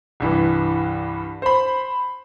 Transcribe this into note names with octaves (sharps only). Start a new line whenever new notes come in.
C2 G2 E3
C5 B5